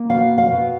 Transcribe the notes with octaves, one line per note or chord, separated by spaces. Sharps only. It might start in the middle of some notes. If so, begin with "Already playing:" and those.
Already playing: A#3
B2 F5
F5
B2